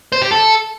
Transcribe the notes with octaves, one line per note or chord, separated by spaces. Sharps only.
C5
G4
A4